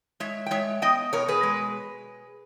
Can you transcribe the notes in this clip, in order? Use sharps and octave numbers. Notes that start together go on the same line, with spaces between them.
G#3 C#5 E5
G5
G#3 C#5 E5
B3 D#5 G5
B2 A#4 C#5
G#4 B4
G#3